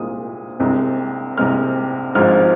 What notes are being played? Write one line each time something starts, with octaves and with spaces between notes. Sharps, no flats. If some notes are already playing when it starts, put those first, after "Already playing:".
Already playing: C2 A#2 G#3 D#6
C2 C3 G#3
C2 C3 G#3 F6
G#1 G#2 F3 F6